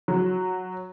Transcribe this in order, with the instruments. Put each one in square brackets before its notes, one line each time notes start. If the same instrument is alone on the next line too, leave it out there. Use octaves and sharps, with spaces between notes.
[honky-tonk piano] F#3